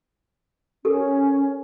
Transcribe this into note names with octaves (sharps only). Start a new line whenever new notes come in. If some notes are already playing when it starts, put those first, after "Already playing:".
C#4 G4 A4 A#4